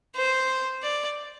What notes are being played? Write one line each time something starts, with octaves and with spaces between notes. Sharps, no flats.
C5
D5